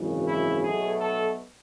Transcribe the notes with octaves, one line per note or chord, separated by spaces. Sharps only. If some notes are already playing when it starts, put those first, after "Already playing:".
Already playing: G#1 F#2 C#3 E3
E4
B1 B2 A3 G#4
A4